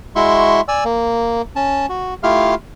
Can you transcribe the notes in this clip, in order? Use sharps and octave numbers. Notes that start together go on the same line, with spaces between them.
G#3 E4 F#4 E5 C6 C#6
D5 G#5 E6
A#3
C#4 A5
F#4
A3 E4 F4 G4 F5 F6